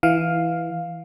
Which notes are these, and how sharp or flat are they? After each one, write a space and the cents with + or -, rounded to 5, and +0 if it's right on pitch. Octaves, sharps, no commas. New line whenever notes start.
E3 +0 F5 +5